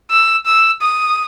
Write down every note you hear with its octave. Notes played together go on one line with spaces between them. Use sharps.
E6
E6
D#6